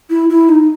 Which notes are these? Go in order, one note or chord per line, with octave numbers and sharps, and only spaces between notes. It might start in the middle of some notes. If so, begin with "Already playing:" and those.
E4
E4
D#4